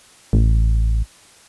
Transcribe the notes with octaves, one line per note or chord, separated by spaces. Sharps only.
A1